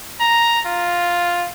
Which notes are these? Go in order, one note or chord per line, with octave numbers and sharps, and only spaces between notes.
A#5
F4